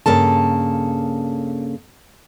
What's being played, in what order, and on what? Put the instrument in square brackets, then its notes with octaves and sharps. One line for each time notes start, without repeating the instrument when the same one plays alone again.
[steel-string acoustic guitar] G2 C#3 A#3 A4 A5